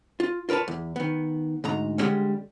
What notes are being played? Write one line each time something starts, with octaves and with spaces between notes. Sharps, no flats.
F4
F4 A#4 B4 C#5 A5
E2
D#3 B3
D2 G#2 A#5
D3 F3 G3 G#3 C#4